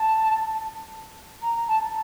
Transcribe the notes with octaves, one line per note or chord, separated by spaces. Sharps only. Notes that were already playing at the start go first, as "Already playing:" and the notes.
Already playing: A5
A#5
A5